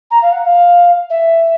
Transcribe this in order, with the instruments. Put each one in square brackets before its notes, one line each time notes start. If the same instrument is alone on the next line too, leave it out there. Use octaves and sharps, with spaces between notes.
[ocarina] A#5
F5
F#5
F5
E5